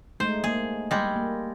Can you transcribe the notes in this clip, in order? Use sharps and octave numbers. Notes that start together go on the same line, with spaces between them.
G#3 A3 D#4 C5
A#3 G#4
G3 G#3
A#3